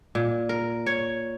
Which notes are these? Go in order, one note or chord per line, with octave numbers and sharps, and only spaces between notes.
A#2
A#4
C#5